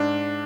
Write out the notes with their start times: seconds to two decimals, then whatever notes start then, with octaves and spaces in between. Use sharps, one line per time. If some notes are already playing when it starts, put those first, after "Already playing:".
Already playing: G#2 D4